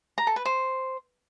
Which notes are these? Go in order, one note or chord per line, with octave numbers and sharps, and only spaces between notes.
A#5
A4
B4
C5